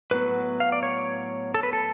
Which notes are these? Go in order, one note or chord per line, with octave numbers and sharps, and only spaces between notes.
A2 F#3 B3 B4
F5
D5
C#5
A4
B4
A4